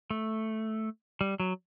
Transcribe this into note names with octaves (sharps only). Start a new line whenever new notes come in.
A3
G3
F#3